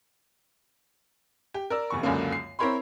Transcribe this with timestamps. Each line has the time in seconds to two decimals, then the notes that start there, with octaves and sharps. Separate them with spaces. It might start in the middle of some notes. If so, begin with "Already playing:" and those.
1.54 G4
1.70 A#4 D5 E6
1.90 F1 E2 C#6
2.03 C#2 F#2 D3 A#3
2.32 C7
2.59 C4 E4 A#4 C#5 B5 C6